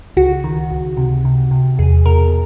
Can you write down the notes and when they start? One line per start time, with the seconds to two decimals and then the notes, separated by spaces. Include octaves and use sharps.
0.17 C#2 F#4
0.44 D#3
0.71 C#2
0.97 C3
1.25 C3
1.51 C3
1.79 E2 G#4
2.06 B2 A#4